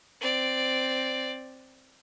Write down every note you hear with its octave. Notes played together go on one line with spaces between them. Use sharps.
C4 D5